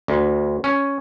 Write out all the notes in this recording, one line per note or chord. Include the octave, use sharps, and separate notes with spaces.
D2
C#4